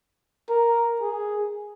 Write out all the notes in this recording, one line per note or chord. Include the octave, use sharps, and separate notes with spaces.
A#4
G#4